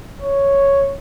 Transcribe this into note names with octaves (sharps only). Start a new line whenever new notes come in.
C#5